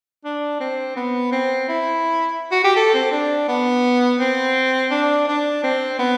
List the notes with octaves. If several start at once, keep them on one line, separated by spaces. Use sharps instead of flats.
D4
C4
B3
C4
E4
F#4
G4
A4
C4
D4
B3
C4
D4
D4
C4
B3